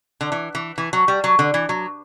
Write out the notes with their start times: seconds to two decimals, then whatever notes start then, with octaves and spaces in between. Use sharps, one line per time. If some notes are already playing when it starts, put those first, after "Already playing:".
0.21 D3
0.32 E3
0.55 E3
0.78 E3
0.93 F#3
1.08 G3
1.24 F#3
1.39 D3
1.54 E3
1.69 F#3